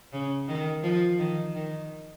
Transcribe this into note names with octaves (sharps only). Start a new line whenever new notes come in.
C#3
D#3
F3
D#3
D#3